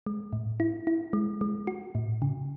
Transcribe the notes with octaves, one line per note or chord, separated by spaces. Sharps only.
G#3
A2
E4
E4
G#3
G#3
F#4
A2
C#3